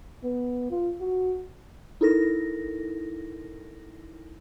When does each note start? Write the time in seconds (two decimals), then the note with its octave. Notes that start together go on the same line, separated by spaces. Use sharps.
0.23 B3
0.71 F4
1.01 F#4
2.01 D#4 E4 A4 A#4 A#6